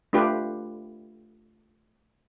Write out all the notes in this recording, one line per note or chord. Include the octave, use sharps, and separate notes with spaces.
A3 D4 F4 G4 B4 F5